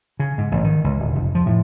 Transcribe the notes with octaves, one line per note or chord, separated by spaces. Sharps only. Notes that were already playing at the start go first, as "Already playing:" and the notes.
C#3
G#2
A1
D#3
C#2
D1
F1
F3
A2